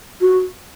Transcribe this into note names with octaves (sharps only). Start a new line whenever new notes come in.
F#4